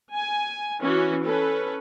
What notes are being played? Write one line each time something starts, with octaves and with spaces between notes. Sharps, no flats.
G#5
E3 C#4 F#4
C#4 A4 B4